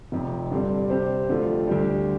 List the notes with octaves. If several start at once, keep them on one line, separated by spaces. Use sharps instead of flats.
F1 F2 C3
G2 D3 G3 C4
C3 G3 C4 G4 C5
F2 D3 A3 F4
D2 D3 G3